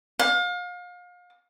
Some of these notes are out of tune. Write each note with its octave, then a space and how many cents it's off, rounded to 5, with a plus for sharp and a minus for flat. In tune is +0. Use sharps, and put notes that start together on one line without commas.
F5 +35